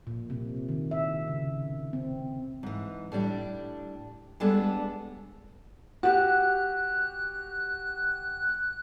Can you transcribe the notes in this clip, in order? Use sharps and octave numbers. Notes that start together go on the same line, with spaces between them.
A#2
C3
D#3
E5
C#3
C4
G#2 E3
A2 G3 D4
G3 G#3 B3 D4 A4
F#4 G4 F#6